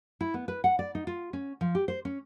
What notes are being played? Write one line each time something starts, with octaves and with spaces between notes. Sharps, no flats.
E4
B3
B4
F#5
D5
D#4
F4
C#4
F3
G4
C5
C#4